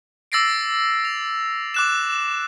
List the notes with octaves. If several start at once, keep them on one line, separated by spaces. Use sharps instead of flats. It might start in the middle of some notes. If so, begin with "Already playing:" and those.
D6 E6 A6 A#6 C7 D7
F7
D6 F#6 E7